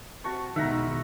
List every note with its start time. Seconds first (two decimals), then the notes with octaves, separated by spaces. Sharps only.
0.24 C3 F#4 A5 C#6
0.56 B1 E2 D#3 G#3 E5 F#5 A#5